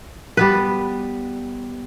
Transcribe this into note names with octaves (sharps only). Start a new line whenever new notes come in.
G3 B3 B4